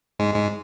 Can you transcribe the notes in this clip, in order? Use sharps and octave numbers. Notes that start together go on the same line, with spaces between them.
G#2 G#3
G#2 G#3